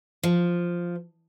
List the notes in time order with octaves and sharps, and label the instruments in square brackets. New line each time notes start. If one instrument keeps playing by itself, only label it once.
[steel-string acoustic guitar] F3